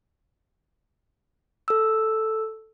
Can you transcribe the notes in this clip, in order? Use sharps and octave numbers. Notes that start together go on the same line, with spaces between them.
A4 E6